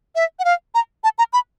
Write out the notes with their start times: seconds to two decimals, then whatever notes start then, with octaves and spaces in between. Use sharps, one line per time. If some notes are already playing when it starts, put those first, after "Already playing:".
0.15 E5
0.39 F#5
0.45 F5
0.75 A#5
1.04 A5
1.18 A#5
1.33 B5